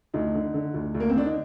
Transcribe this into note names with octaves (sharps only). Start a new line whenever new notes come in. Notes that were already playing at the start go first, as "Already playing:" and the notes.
D2 D#4
D3
D3
D2
D2
A#3
C4
D3 D4
D#4